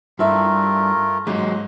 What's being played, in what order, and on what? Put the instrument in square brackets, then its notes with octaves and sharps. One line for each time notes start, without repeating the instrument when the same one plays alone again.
[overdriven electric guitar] G2 [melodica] A3 F4 A#4 [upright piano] E4 E5
[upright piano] G#2 [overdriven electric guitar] F#3 G#3